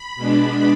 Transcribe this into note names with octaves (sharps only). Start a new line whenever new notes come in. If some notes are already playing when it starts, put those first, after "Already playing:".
Already playing: B5
B2 G#3 D4